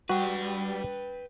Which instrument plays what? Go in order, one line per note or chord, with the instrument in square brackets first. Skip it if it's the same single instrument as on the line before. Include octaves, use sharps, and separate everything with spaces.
[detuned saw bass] G3 [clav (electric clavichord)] F#4 [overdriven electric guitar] B4 G5